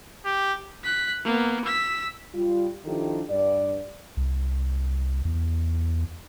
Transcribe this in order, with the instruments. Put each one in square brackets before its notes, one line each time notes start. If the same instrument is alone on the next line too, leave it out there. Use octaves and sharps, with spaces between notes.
[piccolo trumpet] G4
[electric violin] F#6 B6
A#3 B3
E6 B6
[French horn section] G3 F4
D#3 F3 D4 E4 G4 A4
G2 D5
[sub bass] C2
E2